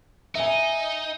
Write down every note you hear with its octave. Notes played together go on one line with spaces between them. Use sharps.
D#4 E5 G#5